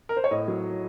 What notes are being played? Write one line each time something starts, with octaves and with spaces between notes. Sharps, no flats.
A#4
C5
C#5
A2 D#5
F#3